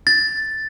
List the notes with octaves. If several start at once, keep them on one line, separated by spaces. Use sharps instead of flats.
A6